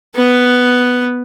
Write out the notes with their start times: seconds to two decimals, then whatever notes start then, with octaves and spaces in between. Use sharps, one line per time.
0.15 B3 B4